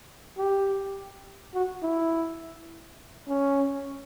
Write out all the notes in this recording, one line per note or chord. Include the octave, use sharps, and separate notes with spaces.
G4
F#4
E4
C#4